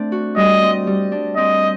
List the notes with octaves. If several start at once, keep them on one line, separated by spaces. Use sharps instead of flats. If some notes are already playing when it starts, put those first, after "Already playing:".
Already playing: A3 C4 D4
F#4
G3 D#5
C4
G3
D4
C4 D#5